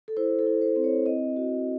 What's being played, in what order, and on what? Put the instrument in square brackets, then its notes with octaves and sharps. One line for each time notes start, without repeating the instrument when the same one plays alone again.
[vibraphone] A4
E4 C5
A4
E4
C5
C4
C#5
C4 D#5
F#4